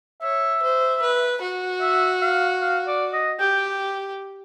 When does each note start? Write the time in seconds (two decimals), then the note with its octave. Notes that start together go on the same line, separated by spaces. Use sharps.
0.22 C#5 E5
0.62 C5
1.02 B4
1.41 F#4
1.81 E5
2.21 F5
2.61 F5
2.87 D5
3.13 D#5
3.39 G4 G5